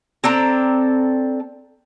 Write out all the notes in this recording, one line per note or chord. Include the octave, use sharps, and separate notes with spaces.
C4 D4 A4 A#5